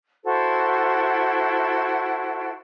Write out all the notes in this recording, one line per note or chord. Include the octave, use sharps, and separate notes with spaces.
E4 F#4 A4 C5